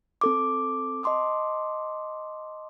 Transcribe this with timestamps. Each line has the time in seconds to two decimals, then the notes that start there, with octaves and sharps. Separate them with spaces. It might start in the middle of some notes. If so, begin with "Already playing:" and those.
0.21 C4 A4 D6
1.03 D#5 A5 C6 D6 D#6